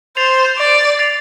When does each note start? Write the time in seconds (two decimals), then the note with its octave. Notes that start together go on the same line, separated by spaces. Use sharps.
0.17 C5 A6 C7 F7
0.58 D5
0.99 A6 C7 F7